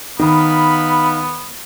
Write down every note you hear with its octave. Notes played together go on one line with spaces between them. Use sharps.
D#3 B3 F5 B5